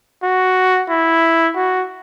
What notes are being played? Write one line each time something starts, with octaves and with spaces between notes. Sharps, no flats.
F#4
E4
F#4